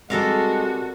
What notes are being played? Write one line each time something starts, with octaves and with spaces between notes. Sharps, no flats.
C3 G3 G#3 F#4 A4 A#4 F5